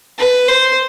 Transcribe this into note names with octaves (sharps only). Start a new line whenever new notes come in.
B4
C5